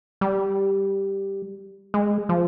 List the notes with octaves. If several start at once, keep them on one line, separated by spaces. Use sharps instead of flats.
G3
G#3
F3